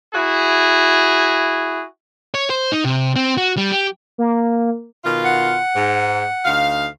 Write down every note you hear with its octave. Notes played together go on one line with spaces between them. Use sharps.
E4 F#4 G#4
C#5
C5
D#4
C3
C4
F#4
G3
G4
A#3
B2 D#3 F4
F#5
G#2
D2 D#4 F5